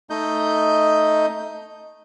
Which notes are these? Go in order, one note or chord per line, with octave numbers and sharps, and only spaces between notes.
A3 D#4 D#5 G6